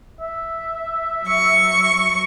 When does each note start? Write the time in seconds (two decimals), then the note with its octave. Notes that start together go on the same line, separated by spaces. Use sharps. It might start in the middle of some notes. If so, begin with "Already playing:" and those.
0.21 E5
1.24 F#3 C#6